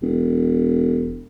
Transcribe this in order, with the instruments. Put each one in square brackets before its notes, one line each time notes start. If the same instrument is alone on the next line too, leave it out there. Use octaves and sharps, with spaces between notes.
[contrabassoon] E1